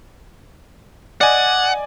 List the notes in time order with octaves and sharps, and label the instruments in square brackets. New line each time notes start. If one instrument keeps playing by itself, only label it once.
[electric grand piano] D5 D#5 G#5 [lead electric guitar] F#5